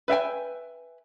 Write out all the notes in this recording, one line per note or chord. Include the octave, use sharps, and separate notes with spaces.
B4 E5 G5 G#5